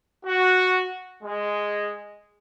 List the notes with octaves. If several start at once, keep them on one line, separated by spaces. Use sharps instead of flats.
F#4
G#3